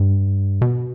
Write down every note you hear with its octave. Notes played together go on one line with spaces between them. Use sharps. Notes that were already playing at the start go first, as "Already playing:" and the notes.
Already playing: G2
B2